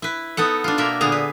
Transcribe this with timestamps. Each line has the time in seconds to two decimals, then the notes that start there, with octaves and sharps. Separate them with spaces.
0.02 E4 B4
0.37 B3 D#4 A4 F#5
0.64 D4 F4
0.78 B2 A#3 A#4 E5
1.01 A#2 D3 B3 G#4 A#5
1.12 B4